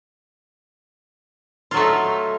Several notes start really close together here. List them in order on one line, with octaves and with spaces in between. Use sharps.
F4 F#3 A3 D#4